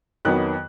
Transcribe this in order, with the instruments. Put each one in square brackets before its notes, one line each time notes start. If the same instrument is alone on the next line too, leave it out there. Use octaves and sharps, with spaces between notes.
[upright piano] F2 D#3 F#3 B3 F#6